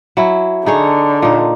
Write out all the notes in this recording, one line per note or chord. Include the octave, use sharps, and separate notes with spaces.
F#3 E4
D3 D#4 G#4 C#5
A#2 D#4